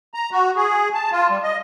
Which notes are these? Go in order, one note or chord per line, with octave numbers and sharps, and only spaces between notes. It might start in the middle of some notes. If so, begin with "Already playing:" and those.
A#5
F#4
G#4
A5
F4
G3
D#5